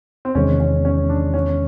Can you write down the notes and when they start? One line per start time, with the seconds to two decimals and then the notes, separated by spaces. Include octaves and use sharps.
0.25 C4
0.35 E2 C3 D#3 G#3 C#4
0.60 C#4
0.85 C#4
1.09 D4
1.34 C#4